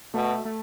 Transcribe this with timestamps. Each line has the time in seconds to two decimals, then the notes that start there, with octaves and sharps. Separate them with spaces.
0.14 B2 A3
0.45 A3